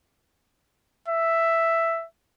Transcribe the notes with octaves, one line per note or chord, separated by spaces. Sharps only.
E5